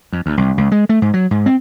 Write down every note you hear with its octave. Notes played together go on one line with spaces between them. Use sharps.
F2
D2
C2
C#2
G#3
A3
G#2
F#3
G#2
C4